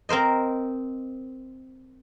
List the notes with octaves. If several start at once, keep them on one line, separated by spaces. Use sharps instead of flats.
C4 A#4 C5 D#5